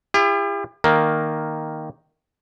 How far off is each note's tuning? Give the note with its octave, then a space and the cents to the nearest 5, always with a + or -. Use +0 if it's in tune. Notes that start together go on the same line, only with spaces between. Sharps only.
E4 +35 G4 +45
D#3 +0 A#3 +0